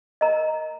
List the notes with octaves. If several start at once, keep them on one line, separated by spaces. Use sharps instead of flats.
A#4 D#5 A#5